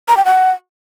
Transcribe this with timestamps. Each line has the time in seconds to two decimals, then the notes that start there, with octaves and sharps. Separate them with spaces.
0.08 A#5
0.17 G5
0.25 F#5